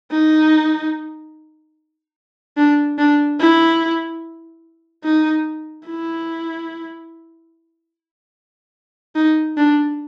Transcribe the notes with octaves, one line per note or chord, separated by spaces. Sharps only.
D#4
D4
D4
E4
D#4
E4
D#4
D4